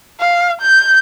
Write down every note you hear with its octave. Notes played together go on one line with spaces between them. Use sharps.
F5
G6